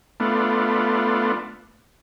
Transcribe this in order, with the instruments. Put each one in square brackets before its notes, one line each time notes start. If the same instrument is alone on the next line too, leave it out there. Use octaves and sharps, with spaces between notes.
[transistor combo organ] A3 B3 D4 F4